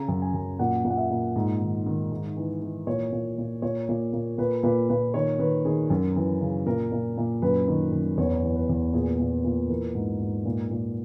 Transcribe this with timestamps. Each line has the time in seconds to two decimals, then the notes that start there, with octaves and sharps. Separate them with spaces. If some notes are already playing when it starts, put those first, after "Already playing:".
Already playing: C#3 A#5
0.08 F#2
0.22 G#5
0.34 F#2
0.59 A#2 F#5
0.85 A#2
0.90 F#5
0.97 E5
1.10 A#2
1.36 G#2
1.61 D#3
1.86 D#3
2.12 G#2
2.37 E3
2.62 E3
2.87 A#2 C#5
3.12 A#2
3.38 A#2
3.62 A#2 C#5
3.89 A#2
4.13 A#2
4.38 A#2 B4
4.63 A#2 B4
4.89 A#2 B4
5.14 D#3 C#5
5.39 D#3 B4
5.65 D#3 G#4
5.90 F#2 A#4
6.16 E3
6.41 C#3
6.66 A#2 A#4
6.92 A#2
7.17 A#2
7.42 F#2 B4
7.68 D#3
7.92 F#2
8.17 E2 C#5
8.44 E3
8.56 B4
8.69 E2
8.93 A#2 G#4
9.20 A#2
9.44 A#2
9.69 E3 A#4
9.95 G#2
10.20 G#2
10.45 A#2
10.70 A#2